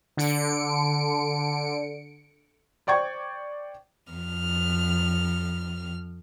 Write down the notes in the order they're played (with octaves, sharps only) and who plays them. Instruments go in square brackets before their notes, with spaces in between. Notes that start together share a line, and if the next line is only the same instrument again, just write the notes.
[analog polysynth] D3 C#7 D7
[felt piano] C5 D5 G5 C#6 G#6
[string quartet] F2 F6